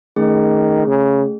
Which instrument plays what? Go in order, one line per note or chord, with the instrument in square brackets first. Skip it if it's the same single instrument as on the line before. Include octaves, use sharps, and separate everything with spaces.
[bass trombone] D#3 [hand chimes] A3 C#4 G#4
[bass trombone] C#3